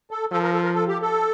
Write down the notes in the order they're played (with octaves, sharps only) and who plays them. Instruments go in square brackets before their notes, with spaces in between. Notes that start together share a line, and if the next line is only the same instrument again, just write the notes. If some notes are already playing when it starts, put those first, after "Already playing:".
[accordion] A4
[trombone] F3 [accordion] A4
[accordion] A#4
A4
A#4
A4
G4
A4